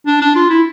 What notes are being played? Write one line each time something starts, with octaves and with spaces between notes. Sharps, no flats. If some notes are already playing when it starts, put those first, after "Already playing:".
D4
D4
F4
E4